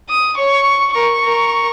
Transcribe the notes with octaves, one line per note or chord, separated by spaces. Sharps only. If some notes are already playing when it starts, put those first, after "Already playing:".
D#6
C#5 C#6
A#4 C#6
A#4